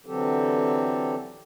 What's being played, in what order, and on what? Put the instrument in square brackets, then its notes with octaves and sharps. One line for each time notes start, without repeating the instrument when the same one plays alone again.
[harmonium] D3 E3 F#3 C4 G4 A4